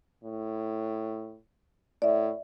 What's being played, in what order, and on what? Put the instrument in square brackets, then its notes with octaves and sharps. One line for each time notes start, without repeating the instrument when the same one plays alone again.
[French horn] A2
[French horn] A2 [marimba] D5 E5